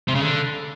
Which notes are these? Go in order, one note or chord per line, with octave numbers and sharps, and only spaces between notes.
C3
C#3
D3